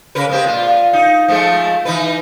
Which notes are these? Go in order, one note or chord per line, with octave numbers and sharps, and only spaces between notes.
C#3 A#4 B4
G#3 C4 G4
A#2 F4
D#4
F3 G#3 A3
E3 D#4 B4